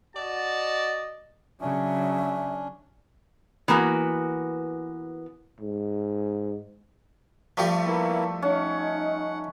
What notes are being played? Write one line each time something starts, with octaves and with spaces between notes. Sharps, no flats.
F#4 D5 D#5 A5
C#3 F#3 C#4 D4 E5
E3 A#3 B3 F#4
G#2
F3 G3 A3 G4
A#3 B3 E4
C#4 D#4 F#5